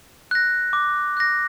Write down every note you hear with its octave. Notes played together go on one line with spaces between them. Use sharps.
F#6 A#6
D6
F#6 A#6